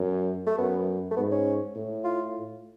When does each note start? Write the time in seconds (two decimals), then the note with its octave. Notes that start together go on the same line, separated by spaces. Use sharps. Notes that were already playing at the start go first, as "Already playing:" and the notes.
Already playing: F#2
0.47 A3
0.58 F#2 B3
1.11 A3
1.17 G#2 B3
1.32 C#4
1.75 A2
2.04 F4